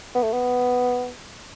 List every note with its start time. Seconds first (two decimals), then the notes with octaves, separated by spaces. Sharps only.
0.15 B3
0.23 A3
0.33 B3